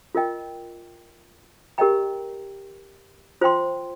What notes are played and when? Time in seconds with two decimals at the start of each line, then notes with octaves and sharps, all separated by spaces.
0.15 F4 A#4 D#5 G5
1.78 G4 A#4 D#5 G5 A#5
3.41 F4 C5 G5 C6